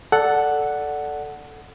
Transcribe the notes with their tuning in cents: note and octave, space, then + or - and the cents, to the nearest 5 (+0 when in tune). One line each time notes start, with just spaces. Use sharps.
A4 +0 D5 +0 F#5 +0